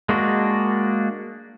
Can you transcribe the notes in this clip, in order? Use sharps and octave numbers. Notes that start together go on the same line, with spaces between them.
G#3 A#3 D4 F#4